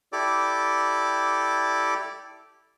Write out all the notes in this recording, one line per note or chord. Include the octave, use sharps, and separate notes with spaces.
E4 G4 A4 D5 D6